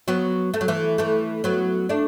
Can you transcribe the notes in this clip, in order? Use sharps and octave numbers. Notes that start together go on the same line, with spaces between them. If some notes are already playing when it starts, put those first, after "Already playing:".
F#3 B3
A3
F#3
E3 A3
E3 A3
F#3 B3
A3 D4